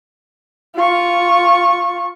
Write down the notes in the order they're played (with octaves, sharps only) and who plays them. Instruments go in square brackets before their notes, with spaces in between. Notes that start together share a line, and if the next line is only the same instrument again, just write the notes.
[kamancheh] F4 C#6